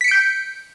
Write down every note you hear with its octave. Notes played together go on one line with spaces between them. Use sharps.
G6 B6 C#7 D7